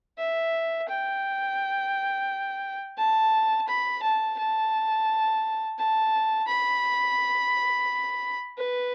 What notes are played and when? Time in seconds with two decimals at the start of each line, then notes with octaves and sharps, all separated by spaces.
0.18 E5
0.89 G5
2.98 A5
3.68 B5
4.02 A5
4.38 A5
5.78 A5
6.47 B5
8.58 B4